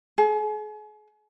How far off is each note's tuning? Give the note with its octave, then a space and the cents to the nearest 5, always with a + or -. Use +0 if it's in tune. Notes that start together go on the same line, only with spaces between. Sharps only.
G#4 +40